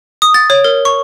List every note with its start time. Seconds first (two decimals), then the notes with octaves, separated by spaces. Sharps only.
0.22 D#6
0.34 A6
0.50 C#5
0.64 A#4
0.85 C#6